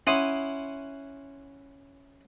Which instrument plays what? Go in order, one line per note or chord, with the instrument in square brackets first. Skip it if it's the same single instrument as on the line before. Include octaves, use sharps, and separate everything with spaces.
[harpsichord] C#4 E4 F#5 C6 D#6